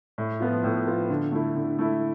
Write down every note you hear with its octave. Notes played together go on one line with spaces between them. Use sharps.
A2
F3 B3 F4
A2
F3 B3 F4
D3
A3 E4
D3
A3 E4